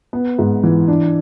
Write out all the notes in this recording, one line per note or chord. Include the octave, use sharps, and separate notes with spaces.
B3
G#2
E3
D4